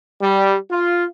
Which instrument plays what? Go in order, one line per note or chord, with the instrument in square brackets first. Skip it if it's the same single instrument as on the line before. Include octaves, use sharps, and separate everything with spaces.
[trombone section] G3
F4